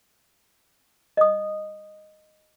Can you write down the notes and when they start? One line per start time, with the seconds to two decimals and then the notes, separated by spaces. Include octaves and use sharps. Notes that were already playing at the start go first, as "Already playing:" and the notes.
1.17 D#5 D#6